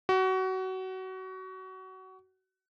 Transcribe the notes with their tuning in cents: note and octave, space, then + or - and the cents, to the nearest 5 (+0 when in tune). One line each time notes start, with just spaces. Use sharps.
F#4 +25